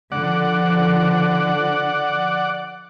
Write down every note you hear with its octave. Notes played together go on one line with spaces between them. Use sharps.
D3 F3 D5 F#5